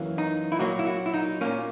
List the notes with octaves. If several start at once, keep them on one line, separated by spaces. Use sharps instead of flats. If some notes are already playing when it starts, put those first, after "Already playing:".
Already playing: F#2 E3 A#3
D#4
E4
A#2 F#3 A#3 F#4
E4
F#4
E4
D#4
A#2 A#3 C#4